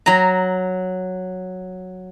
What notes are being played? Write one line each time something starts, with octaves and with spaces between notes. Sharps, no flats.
F#3 A#5